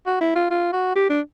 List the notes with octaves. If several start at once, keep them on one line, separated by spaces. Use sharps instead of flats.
F#4
E4
F4
F4
F#4
G4
D4